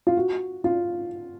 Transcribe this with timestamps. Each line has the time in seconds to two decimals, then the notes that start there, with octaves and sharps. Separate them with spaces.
0.07 F4
0.17 F#4
0.64 F4